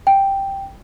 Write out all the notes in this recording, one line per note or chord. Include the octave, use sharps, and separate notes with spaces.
G5